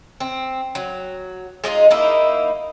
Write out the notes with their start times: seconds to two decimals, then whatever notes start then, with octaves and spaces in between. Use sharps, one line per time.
0.20 C4
0.75 F#3
1.64 G#3 D4 D#4 F4
1.91 A#3 D#4 E4